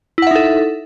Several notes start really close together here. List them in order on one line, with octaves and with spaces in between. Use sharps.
E4 F#5 E5 D#4 A4